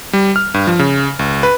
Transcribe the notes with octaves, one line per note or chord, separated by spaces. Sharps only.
G3
F6
G2
F3
C#3
C#2
B4